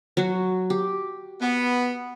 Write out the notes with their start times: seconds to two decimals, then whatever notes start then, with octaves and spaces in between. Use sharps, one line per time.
0.17 F#3 F#4
0.70 G4
1.41 B3